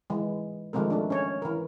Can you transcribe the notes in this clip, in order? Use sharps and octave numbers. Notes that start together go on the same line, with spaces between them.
E3 G#3
D#3 F3 G#3 A3 C4 A#4
A3 D4
C#4 C#5
E3 A#4